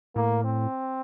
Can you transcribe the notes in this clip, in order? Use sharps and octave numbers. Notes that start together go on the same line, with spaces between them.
A2 A#3
C4